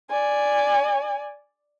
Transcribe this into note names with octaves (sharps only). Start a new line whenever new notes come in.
D5 G#5